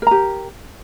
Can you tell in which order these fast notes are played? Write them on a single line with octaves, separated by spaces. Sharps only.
A#4 A#5 G4